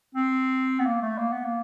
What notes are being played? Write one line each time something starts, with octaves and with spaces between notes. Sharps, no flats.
C4
B3
A#3
A3
A#3
B3
A#3